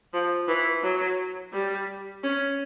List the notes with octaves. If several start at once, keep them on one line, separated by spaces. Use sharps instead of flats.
F3
E3
F#3
G3
C#4